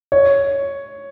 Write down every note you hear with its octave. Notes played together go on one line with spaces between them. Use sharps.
C#5